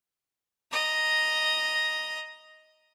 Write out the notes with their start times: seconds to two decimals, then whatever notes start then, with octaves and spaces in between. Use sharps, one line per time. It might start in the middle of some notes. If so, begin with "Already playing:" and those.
0.71 D#5 A#5